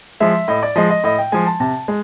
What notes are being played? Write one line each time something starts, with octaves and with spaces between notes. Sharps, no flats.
F3 G#3 E5
A2 D#5
D5
F3 G#3 D#5
D#5
A2 D#5
G5
F3 G#3 G#5
A5
C3 A5
G#3